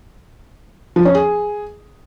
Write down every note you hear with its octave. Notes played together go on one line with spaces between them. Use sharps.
F3
C#4
G#4